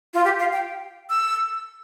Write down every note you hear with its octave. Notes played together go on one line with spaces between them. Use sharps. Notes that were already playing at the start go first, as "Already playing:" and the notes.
F4
G4
F5
G5
E6